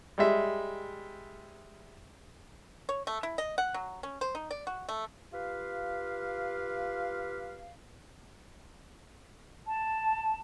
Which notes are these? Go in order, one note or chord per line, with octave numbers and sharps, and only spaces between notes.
G3 G#3 E5
C#5
A3
E4
D#5
F#5
F#3
C#4
C5
D#4
D5
F#4
A3
F4 G4 B4 F5
A5